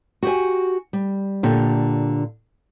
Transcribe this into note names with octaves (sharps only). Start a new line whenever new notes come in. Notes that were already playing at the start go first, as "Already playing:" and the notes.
F#4 G4 G#5
G3
A#2 D3 G4